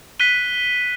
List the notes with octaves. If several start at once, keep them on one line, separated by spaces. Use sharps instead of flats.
F#6 B6 D#7 G7